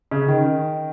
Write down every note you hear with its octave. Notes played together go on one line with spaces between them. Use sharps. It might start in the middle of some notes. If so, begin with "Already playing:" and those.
C#3
D#3